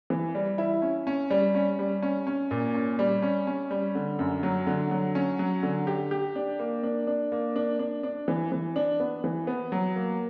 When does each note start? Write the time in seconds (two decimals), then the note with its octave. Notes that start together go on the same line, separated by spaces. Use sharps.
0.10 E3
0.35 G3
0.58 E4
0.82 C#4
1.07 C#4
1.30 G3
1.55 C#4
1.79 G3
2.02 C#4
2.27 C#4
2.51 A#2
2.74 C#4
2.99 G3
3.22 C#4
3.47 C#4
3.71 G3
3.95 D3
4.19 F#2
4.43 F#3
4.67 D3
4.91 F#3
5.15 C#4
5.39 F#3
5.63 D3
5.87 G4
6.11 G4
6.36 D4
6.59 A#3
6.83 D4
7.07 D4
7.32 A#3
7.56 D4
7.79 D4
8.03 D4
8.28 E3
8.52 E3
8.76 D4
9.00 B3
9.24 E3
9.47 B3
9.72 F#3
9.96 A#3